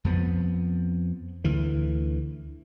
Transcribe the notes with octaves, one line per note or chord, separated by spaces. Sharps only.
F2 F3 B3
D2 D3 E3